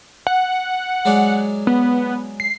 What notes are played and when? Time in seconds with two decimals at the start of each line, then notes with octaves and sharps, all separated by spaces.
0.27 F#5
1.05 F#3 G#3 D5
1.67 B3
2.40 C7